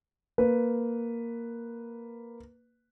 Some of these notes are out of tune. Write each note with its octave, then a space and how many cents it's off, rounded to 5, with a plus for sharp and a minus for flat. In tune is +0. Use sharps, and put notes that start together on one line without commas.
A#3 +0 B4 +0